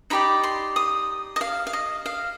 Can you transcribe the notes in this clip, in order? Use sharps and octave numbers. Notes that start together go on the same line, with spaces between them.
D#4 G4 D5 B5
C6
D#6
D#5
F5
F5
D#5
F5